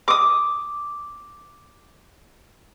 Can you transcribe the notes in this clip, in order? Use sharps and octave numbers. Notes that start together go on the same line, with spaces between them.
D6 D#6